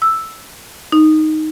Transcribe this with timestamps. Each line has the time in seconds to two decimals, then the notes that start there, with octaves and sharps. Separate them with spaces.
0.02 E6
0.92 D#4